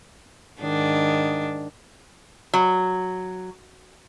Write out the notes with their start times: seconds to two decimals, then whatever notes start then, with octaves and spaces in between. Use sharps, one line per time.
0.62 G#2 D#3 D4
2.53 F#3